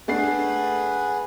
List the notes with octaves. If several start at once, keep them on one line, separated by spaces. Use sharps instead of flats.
A3 D4 G#4 B4 F#5 C7